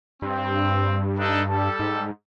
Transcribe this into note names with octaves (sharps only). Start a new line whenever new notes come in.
G2 C4
D4 D#4 A4
G3 A4
G#2